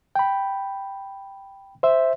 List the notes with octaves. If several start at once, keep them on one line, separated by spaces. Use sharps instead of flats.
G5 B5
C5 E5